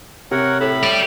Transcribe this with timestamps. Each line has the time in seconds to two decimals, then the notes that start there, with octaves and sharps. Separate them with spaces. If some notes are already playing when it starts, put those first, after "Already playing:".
0.31 C3 A#4 C#5 F#5
0.60 A2 B5
0.83 G4 D5